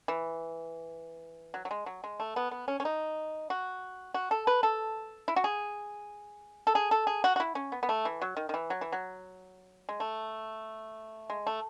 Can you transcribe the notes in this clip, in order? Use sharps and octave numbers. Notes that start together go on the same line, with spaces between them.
E3
F#3
F#3
G#3
F#3
G#3
A3
B3
B3
C#4
C#4
D#4
F#4
F#4
A4
B4
A4
E4
F#4
G#4
A4
G#4
A4
G#4
F#4
F#4
E4
C#4
B3
B3
A3
E3
F#3
D#3
D#3
E3
F#3
E3
F#3
G#3
A3
G#3
A3